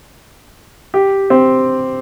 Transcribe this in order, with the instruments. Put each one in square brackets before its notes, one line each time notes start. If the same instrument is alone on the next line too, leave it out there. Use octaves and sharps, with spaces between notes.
[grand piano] G4
C4